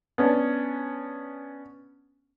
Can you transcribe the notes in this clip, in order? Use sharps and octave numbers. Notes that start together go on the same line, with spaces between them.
B3 C#4 D4